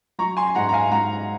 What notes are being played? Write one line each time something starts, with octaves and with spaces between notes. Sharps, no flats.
F#3 A#5 C#6
G#5 C6
G#5
G#2 F#5 A#5
A#5
F5 G#5
G#2 F#5 A#5